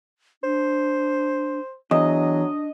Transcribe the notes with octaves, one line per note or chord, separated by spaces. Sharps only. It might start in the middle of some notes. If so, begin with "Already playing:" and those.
D4 C5
E2 F#3 D4 D#5